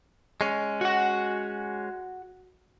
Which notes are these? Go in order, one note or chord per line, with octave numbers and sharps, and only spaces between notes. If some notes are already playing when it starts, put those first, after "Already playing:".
G#3 C#4
F#4 F#5